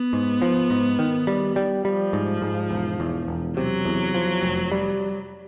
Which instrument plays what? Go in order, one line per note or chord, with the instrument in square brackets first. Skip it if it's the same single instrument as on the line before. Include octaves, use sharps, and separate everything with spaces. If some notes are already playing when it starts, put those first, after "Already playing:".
Already playing: [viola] B3
[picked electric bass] G#2
F3
G#2
D#3
G3
G3
[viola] F3 [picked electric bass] G3
[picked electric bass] G#2
G#2
E1
E2
E1
[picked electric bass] C3 [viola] F#3
[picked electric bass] E2
F3
F1
G3